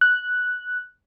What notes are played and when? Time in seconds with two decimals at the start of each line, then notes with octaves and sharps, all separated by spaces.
0.01 F#6